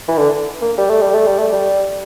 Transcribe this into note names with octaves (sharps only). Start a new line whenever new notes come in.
E3
D3
A#3
G3
A3
G3
A3
G3
A3
G3